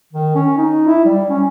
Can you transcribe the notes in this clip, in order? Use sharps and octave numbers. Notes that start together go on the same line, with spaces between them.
D#3
C#4
D#4
E4
G3
C#4